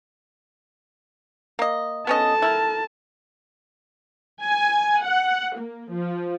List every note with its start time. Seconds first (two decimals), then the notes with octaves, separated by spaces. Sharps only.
1.59 A#3 D#5
2.07 B3 C#4 A4 D#5 A5
2.42 E4 A#4
4.42 G#5
5.03 F#5
5.57 A#3
5.91 F3